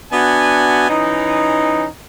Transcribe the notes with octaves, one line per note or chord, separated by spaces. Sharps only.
B3 D4 F#4 E5 G#5
E3 C#4 D#4